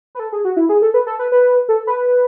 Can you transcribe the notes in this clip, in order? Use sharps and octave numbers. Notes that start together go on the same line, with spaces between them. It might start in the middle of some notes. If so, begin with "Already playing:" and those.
B4
A4
G#4
F#4
E4
G#4
A4
B4
A4
B4
B4
A4
B4